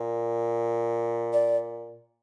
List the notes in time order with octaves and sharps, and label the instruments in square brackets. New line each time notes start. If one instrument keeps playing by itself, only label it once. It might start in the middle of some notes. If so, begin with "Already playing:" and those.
Already playing: [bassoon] A#2
[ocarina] D5